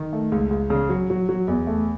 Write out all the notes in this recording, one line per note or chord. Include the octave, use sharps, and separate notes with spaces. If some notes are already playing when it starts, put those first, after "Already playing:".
Already playing: D#3
A3
C#2
C#2
C#3
F#3
F#3
F#3
E2
A3